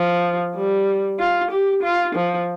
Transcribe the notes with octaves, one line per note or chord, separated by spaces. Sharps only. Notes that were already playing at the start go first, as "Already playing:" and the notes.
Already playing: F3
G3
F4
G4
F4
F3